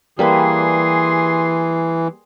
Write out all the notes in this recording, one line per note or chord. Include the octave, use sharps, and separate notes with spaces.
E3 G3 A#3 G#4 B4 C6